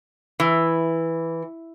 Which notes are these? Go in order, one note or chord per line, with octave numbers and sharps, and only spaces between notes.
E3